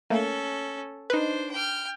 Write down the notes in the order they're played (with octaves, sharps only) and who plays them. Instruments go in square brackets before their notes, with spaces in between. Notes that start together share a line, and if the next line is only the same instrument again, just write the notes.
[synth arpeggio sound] A3 A#3 [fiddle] C#4 A4
[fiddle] D4 C5 [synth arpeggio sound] D#4 B4
[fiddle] G5 F6